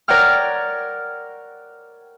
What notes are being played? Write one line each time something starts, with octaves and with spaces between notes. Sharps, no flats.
A#4 C#5 D5 F#5 G5 F6